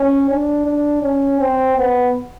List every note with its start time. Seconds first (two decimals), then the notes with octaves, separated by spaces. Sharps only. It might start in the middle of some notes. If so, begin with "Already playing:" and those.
Already playing: C#4
0.30 D4
0.66 D4
1.03 C#4
1.40 C4
1.76 B3